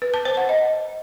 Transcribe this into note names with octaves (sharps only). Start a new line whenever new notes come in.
B4
A5
C5
F#5
D#5